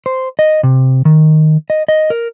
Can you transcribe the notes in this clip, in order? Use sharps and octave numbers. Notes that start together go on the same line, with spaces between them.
C5
D#5
C3
D#3
D#5
D#5
A#4